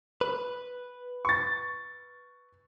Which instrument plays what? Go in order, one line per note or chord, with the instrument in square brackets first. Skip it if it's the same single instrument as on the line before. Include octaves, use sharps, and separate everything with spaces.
[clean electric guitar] B4
[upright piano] C#6 A6